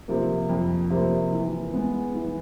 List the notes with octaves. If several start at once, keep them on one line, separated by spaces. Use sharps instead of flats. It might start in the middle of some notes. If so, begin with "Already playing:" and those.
C3 F3 A#3
F2
C3 F3 A#3
E3
G#3 B3
E3